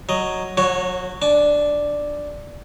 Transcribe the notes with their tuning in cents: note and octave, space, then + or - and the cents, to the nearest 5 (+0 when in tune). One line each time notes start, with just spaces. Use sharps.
F#3 +0 D#5 +0
F#3 -35 F#4 +0 C#5 +0
D4 +0 G#5 +45